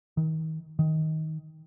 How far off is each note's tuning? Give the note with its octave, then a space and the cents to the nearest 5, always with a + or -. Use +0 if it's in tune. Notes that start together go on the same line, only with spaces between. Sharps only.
D#3 +35
D#3 +15